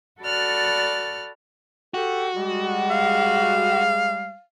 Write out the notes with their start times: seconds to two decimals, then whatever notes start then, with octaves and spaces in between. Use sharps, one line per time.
0.20 F#4 A4 D5 B5 F6 F#6
1.94 F#4 G4 A4
2.35 G3 G#3
2.91 F5